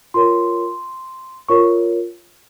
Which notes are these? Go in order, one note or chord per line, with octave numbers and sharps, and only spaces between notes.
F4 A#4 C#5 C6
F4 A#4 C#5 C#6